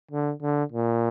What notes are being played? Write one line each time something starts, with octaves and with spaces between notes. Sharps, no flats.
D3
D3
A#2